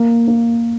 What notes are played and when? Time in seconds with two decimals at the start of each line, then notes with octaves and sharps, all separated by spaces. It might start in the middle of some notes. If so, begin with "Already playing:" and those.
Already playing: A#3
0.28 A#3